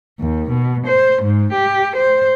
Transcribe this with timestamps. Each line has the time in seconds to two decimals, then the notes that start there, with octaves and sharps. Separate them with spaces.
0.20 D#2
0.50 B2
0.87 C5
1.22 G#2
1.53 G4
1.96 C5